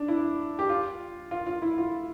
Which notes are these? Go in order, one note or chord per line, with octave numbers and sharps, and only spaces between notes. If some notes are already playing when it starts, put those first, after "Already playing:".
Already playing: D4
E4
G4
F4
F4
F4
E4
F4